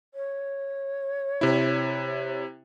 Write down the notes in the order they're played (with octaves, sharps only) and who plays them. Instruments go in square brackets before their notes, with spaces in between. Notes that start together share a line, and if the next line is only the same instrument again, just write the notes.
[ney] C#5
[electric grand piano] C3 E4